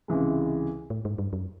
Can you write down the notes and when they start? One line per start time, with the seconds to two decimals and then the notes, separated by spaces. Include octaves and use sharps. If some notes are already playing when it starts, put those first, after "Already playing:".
0.08 C#2 C3 E3 G#3
0.90 A2
1.05 G#2
1.18 G2
1.33 F#2